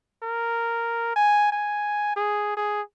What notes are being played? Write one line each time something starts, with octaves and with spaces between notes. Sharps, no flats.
A#4
G#5
G#5
G#4
G#4